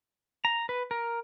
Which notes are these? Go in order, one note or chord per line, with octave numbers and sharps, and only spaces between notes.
A#5
B4
A#4